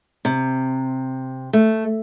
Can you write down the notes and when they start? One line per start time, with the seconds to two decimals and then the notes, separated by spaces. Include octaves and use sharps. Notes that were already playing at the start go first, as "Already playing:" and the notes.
0.25 C3
1.53 A3